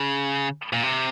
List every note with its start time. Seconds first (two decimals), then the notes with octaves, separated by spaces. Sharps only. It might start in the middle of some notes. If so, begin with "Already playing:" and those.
Already playing: C#3
0.73 A#2
0.83 C3